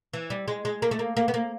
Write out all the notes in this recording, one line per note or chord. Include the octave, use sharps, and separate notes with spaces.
E3
G3
G#3
G#3
A#3
A3
A#3
A#3
B3
A#3